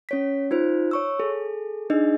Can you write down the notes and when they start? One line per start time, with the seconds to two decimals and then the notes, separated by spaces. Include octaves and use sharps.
0.09 C#4 C#5 B6
0.51 D#4 F4 C5
0.91 C#5 C#6 E6
1.19 G#4 A4
1.90 D4 D#4 G#4 D#5